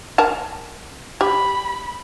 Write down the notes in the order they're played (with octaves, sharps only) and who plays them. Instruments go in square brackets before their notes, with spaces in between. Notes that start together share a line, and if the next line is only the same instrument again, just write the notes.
[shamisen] A#4 G#5 A5
[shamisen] G4 [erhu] B5